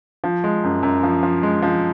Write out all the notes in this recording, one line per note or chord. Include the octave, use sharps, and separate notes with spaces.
F3
G#3
F#2
F#2
F3
F3
G#3
F3